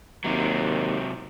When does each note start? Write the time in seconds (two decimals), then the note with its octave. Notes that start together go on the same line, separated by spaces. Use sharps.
0.24 D#2 C3 F#3